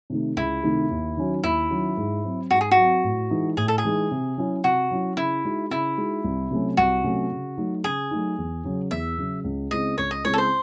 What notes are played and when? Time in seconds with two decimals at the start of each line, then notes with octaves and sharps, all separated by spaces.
0.10 C3 D#3 A3 D#4
0.36 C#2 E4
0.63 C3 D#3 A3 D#4
0.91 D#2
1.17 D#3 F#3 C#4 F#4
1.43 D#2 E4
1.70 D#3 F#3 C#4 F#4
1.97 G#2
2.24 F#3 C4
2.50 G#2 F#4
2.61 G#4
2.71 F#4
2.77 F#3 C4
3.04 A2
3.31 E3 G#3 D#4
3.57 A2 G#4
3.68 A4
3.78 G#4
3.84 E3 G#3 D#4
4.11 C3
4.37 F#3 C#4 E4
4.64 C3 F#4
4.91 F#3 C#4 E4
5.17 C#3 E4
5.45 G#3 D#4 F#4
5.70 C#3 E4
5.98 G#3 D#4 F#4
6.24 C2
6.51 C3 F#3 A3 C#4
6.77 C2 F#4
7.04 C3 F#3 A3 C#4
7.31 C#3
7.57 F#3 A3 D#4
7.84 C#3 G#4
8.11 F#3 A3 D#4
8.38 E2
8.64 C#3 F#3
8.91 E2 E5
9.18 C#3 F#3
9.44 C#2
9.71 C#3 G#3 C4 E4 D#5
9.98 C#2 C#5
10.11 D#5
10.24 C#3 G#3 C4 E4 C#5
10.33 A4
10.38 C5